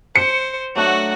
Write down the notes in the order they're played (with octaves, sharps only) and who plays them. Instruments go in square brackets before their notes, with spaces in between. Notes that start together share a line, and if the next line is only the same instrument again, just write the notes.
[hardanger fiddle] C5 [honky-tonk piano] C#7
[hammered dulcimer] F#3 A3 D4 [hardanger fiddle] F#4 F#5